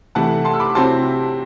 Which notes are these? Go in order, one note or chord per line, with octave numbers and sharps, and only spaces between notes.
C3 E3 A3 E4 F#5 A5
A5 C6
E6
B5 D6
C3 F#3 C4 E4 A5 C6